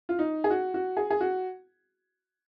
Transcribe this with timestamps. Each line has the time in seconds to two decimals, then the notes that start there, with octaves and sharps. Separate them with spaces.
0.09 F4
0.19 D#4
0.44 G#4
0.50 F#4
0.74 F#4
0.97 G#4
1.10 G#4
1.21 F#4